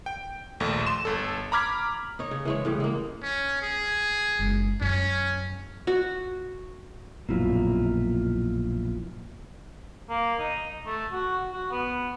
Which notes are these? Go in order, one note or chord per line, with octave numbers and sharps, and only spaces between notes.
G5
A#1 D#2 A3
C6 E7
G1 A4
A#5 B5 D6 F6 G#6 B6
D#4 C#5
C#3
E3 G#3 C#5
A2 C#3 G3
G#3 A#3
C#4
G#4
F#1 G#3
F#2 C#4
F#4
A#1 F#2 B2 A#3 E4 F4
A#3
D#4
A3
F#4
F#4
B3